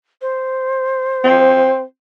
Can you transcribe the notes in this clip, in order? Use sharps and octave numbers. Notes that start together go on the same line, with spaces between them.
C5
C4